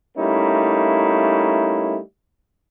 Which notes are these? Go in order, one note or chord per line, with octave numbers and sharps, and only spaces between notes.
G3 A3 A#3 C#4 D#4 E4